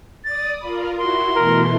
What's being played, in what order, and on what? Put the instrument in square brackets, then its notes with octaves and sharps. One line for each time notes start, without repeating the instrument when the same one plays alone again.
[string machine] D5 D#6 [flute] A6
[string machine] F4 A#4 [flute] B5
[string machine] E4 F#4 [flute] C6
[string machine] B2 E3 A3 [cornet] A#4